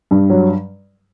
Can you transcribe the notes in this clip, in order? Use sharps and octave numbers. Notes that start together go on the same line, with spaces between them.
G2
F#3